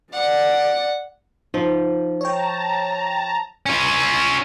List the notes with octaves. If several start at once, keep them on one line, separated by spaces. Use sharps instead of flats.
D5 F#5
F3 D#4
C#5 G5 A5 A#5
C#4 F4